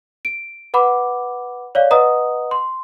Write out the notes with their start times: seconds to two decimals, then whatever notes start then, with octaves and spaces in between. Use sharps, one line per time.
0.25 D7
0.74 B4 F#5 B5 D6
1.75 C#5 D5 F5
1.91 B4 D#5 F#5 A#5 D#6
2.51 C6